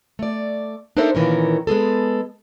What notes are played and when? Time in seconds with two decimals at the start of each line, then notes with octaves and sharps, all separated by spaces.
0.19 A3 D5
0.97 D4 D#4 A4 A#4 C5 E5
1.15 A#2 D#3 E3 C#4 A#4
1.67 G#3 B3 G#4 A4